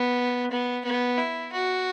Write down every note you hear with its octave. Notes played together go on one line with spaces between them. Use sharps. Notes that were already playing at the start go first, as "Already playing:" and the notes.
Already playing: B3
B3
B3
E4
F#4